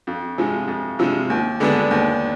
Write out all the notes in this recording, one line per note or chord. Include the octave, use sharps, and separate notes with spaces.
F2
C3 F3 G#3
F2
C3 F3 G#3
D#2
D3 G#3 B3 D4
D#2